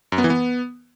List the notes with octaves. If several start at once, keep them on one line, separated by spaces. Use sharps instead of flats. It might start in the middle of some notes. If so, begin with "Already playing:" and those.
F#2
B3
E3
B3